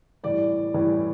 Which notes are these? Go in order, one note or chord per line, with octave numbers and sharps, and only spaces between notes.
A2 E3 G3 D5
A2 E3 G3